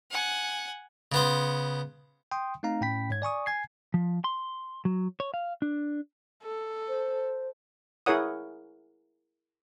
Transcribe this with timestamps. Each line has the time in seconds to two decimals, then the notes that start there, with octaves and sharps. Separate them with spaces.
0.11 F#5 G#5
1.12 C#3 B3 C5
2.31 G5 C6 D#6
2.63 A3 C4 D#4 F5 A#5
2.81 A2 C#4 G5 B5 B6
3.10 G#2 C#5 G#6
3.22 D5 G#5 C#6 D#6
3.46 G#5 G#6 C7
3.94 F3
4.24 C6
4.85 F#3
5.20 C#5
5.34 F5
5.62 D4
6.43 A4
6.88 C5
8.06 E4 G#4 A#4 C#5 F#5 D#6